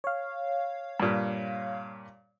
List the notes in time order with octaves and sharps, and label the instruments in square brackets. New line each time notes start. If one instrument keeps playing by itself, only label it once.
[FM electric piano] C#5 F5
[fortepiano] G2 A#2